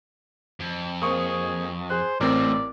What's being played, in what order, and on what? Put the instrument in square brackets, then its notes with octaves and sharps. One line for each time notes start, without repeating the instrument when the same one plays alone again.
[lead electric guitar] F2
[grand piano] A#3 C4 [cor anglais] G#4 [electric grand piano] C#6 D#6
[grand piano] G#4 F#6 [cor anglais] C5
[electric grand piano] A1 C4 [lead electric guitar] A2 [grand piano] A#4 [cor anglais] D5